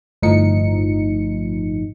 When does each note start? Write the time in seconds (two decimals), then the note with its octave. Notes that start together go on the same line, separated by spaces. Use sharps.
0.22 G1 A2 F3 D#4 C#7